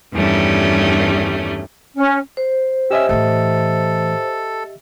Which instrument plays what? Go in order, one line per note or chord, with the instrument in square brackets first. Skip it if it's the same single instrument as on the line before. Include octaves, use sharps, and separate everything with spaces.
[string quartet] E2 G2 D#3 G3 A3 C#4
[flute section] C#4
[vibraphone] C5
[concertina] C#4 E6 [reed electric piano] G4 D#5 E5
[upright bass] A2 E3 [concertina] A4